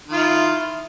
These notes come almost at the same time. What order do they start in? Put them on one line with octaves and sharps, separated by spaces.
D#3 F4 E4